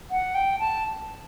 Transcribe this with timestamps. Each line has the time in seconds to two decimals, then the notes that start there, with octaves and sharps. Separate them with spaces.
0.11 F#5
0.35 G5
0.59 A5